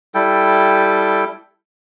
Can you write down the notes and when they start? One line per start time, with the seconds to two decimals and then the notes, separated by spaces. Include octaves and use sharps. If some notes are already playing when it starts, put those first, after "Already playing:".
0.14 G3 E4 A4 G5